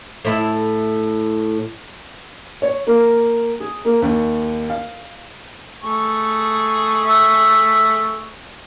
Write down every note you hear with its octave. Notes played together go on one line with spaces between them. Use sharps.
A2 E4
C#5
A#3
G#4
A#3
D#2
F5
A3 G#4 C#6
E5